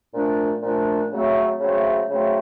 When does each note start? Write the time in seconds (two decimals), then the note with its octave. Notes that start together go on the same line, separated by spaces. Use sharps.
0.14 A#2 F3 A3 D4
0.63 A#2 F3 A3 D4
1.11 C#3 F#3 A3 C4
1.60 C#3 F#3 A3 C4
2.09 C#3 F#3 A3 C4